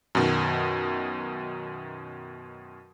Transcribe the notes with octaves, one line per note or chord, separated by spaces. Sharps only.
F#2 B2 D#3